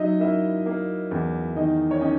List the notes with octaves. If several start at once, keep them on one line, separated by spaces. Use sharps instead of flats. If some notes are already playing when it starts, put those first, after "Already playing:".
Already playing: F#3 D#4 D#5 E5
A#3 E4 E5
A#3
E2
D#3 D#4 D#5
C#5
C#4 D#4 D#5